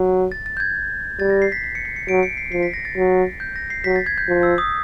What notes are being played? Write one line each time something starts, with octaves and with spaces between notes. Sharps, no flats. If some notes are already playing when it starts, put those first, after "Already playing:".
Already playing: F#3
A6
A6
G6
G#6
G3 A6
A#6
C7
B6
B6
C#7
C7
C#7
F#3 D7
C#7
C7
F3 C7
B6
A#6
A6
F#3
G6
A#6
C7
F#3 B6
A6
G#6
G6
F3
E6
D#6